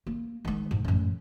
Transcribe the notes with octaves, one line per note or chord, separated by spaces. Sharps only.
A#3
D#3 G#3
G#2
A1 F#2